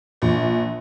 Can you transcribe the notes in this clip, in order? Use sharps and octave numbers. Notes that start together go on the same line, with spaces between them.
A#1